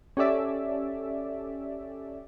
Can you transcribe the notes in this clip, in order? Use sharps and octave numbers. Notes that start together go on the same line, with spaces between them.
C#4 G4 A4 D5 E5